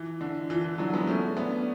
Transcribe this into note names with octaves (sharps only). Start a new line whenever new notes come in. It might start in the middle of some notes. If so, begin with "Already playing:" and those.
Already playing: E3
D3
E3
E3
D3 F#3
G#3 B3
A3 C#4
B3 D4